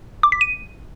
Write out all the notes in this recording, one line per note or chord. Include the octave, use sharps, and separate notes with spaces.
D6
B6
D#7